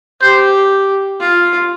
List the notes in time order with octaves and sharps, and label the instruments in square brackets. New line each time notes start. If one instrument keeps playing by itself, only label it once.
[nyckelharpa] G4 [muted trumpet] C5
[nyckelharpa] F4